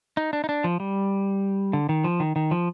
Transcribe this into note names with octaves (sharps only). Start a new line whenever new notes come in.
D#4
D4
D#4
D4
F3
G3
D3
D#3
F3
D#3
D#3
F3